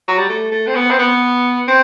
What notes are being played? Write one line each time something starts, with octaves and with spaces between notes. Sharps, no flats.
F#3
G3
A3
A3
C4
B3
C4
B3
C4